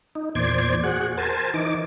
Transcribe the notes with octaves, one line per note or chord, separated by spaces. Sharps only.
D#4
E2 A#2 C5 D5 G#6
F#4 G#4 F#5
A#4 C5 G#5 A5
E3 D#4 D6